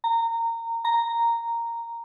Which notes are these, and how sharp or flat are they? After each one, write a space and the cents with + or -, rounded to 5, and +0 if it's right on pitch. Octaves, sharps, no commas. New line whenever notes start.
A#5 -20
A#5 -5